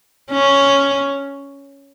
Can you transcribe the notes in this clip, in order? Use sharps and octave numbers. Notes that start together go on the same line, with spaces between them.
C#4